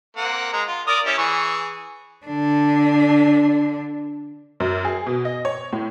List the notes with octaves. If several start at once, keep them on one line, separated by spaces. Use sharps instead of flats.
A#3 C4 F#5
G#3 A#5
F4
A#4 D5 D#6
C#4 E4 G4
E3 G#4 C#6
D3 D4
F#2
G#4
B2
D#5
C#5
A2